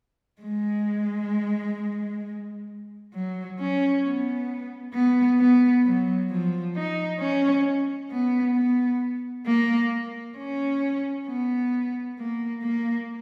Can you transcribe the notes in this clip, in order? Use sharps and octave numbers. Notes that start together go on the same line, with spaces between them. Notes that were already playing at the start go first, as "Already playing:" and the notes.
G#3
F#3
C#4
B3
B3
B3
F#3
F3
D#4
C#4
B3
B3
A#3
C#4
B3
A#3
A#3